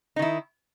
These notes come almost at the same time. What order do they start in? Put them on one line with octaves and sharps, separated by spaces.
D#4 D#3 E4